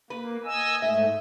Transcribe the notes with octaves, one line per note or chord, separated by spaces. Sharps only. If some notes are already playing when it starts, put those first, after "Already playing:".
A#3 B4
D#5 G#5 E6
G#2 A3 E5